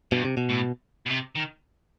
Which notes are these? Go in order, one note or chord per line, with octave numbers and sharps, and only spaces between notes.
G2 B2
C3
B2
A2
B2
C3
D#3